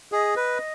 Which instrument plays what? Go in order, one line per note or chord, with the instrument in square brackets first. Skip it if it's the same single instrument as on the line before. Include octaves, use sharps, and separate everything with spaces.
[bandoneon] G#4 [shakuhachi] D#5
[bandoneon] B4